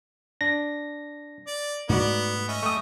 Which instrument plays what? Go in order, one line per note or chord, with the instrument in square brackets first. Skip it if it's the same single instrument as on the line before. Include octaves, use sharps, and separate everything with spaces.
[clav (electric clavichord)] D4 [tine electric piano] A#6
[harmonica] D5
[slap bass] G#2 G#3 A3 [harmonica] B3 [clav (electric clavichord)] D#4 F#4 D5
[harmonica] C#4 D#5 E5
[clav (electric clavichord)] A3 G5 [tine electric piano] C#6 D#6